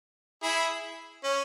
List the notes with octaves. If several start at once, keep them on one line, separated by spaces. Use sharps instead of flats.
E4 G#4
C#4